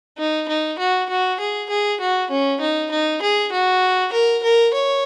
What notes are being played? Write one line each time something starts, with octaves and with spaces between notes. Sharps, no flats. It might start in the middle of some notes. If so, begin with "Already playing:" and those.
D#4
D#4
F#4
F#4
G#4
G#4
F#4
C#4
D#4
D#4
G#4
F#4
A#4
A#4
C#5